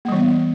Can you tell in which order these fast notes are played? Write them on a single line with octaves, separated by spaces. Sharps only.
A#3 G3 E3 B3